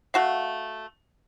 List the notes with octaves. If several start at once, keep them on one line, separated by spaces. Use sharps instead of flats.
A3 F#4 F5